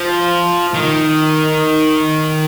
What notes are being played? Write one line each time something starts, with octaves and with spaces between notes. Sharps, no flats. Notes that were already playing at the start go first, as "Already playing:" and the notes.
Already playing: F3
D#3